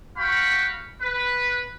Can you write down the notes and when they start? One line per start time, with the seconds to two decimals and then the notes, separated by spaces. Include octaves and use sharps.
0.17 F#4 F5 G5 B5 C#6
1.01 B4